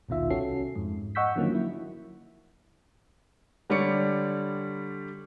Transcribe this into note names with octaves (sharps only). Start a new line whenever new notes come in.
A#1 D#2 B2 D#3 F4 E5
C2 C#4 F#4 A4 C7
F2 G#2
D#5 F#5 C#6 E6 G6 B6
D3 D#3 F3 F#3 A#3 C#4
F#3 E4
D3 G3 C#5 D5 C#7